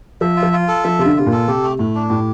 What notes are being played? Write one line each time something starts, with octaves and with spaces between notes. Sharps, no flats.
F3 E5
F4
F3
F4
A4
F3 E5
C3 F4
D3
C3 F4
A#2
A4
C3 G4
A3
A2 A3
D4
A2 G4